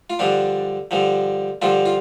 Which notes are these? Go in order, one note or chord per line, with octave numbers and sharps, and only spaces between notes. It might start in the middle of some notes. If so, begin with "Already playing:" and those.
F4
G2 D3 F3 D4
G2 D3 F3
G2 D3 F3 F4
F4